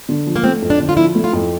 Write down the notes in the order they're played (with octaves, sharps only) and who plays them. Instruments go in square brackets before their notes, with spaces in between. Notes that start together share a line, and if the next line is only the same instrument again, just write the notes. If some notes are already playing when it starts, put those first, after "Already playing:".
[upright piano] D3
F3
[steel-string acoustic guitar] A#3
[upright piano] A3 [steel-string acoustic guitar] C4
[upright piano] F2
[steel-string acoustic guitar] D4
[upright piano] D3
[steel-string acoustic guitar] F4
[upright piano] F3 [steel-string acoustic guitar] E4
[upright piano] A3
[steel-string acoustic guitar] F4
[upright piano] F2